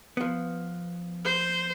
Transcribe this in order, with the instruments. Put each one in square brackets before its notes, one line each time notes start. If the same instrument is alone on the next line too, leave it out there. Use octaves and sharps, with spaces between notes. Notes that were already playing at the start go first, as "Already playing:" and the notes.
[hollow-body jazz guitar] F3 B3
[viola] C5